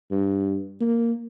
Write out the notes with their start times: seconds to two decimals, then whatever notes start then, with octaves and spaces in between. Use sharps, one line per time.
0.11 G2
0.80 A#3